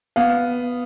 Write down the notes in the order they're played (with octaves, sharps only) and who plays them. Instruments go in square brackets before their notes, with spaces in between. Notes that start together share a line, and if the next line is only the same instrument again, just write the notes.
[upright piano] B3 [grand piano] F5